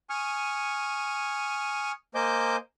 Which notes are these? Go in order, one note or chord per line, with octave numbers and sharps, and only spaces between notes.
G#5 C#6 D#6 F6
A#3 C5 D#5 G#5 D6 G6